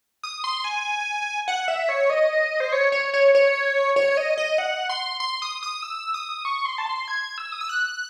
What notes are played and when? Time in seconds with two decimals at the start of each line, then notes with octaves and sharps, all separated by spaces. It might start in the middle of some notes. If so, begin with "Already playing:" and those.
0.23 D#6
0.44 C6
0.64 G#5
1.48 F#5
1.68 E5
1.89 C#5
2.10 D#5
2.60 C5
2.72 C#5
2.92 C#5
3.14 C#5
3.35 C#5
3.96 C#5
4.17 D#5
4.38 D#5
4.58 F#5
4.89 C6
5.20 C6
5.42 D#6
5.63 D#6
5.82 E6
6.14 D#6
6.45 C#6
6.65 C6
6.78 A5
6.86 C6
7.08 G#6
7.38 E6
7.52 D#6
7.61 E6
7.69 F#6